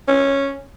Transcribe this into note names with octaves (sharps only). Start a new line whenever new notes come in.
C#4